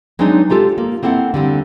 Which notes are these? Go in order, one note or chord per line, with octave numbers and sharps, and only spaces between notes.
F#3 G#3 B3 C4 D4 D#4
G#3 F4 G4 A4
A#3
A#3 C4 E4 A4 F#5
D3 G3 C4